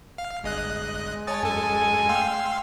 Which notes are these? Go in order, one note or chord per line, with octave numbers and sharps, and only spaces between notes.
F5
G1 G#3 D#5 F#6
C#5 G#5 A5 D#6 A6
F#2 A4 G#5
A3 F5 G5 C6 E6